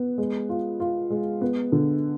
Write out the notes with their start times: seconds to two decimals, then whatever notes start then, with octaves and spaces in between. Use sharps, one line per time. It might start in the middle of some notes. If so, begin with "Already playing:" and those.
Already playing: B3
0.18 G#3
0.49 F4
0.80 F4
1.10 G#3
1.41 B3
1.72 D3